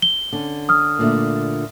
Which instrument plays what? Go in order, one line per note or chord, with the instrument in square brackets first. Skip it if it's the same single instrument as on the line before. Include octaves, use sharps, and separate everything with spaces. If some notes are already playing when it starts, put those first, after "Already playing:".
[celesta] G7
[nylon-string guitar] D3 C#4
[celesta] D#6 F6
[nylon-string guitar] A#2 D3 A3